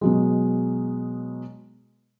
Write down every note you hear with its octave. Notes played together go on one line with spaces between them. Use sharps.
B2 F#3 G#3